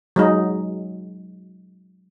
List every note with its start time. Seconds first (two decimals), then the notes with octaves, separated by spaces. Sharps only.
0.16 F#3 G#3 D#4